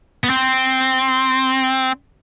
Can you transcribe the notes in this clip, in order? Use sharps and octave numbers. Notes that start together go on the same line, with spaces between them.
B3
C4